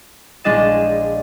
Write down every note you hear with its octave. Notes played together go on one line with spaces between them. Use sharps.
A#1 G#3 D4 D#5 A6 E7